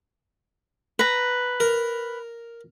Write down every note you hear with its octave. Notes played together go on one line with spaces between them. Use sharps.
B4 A#5
A#4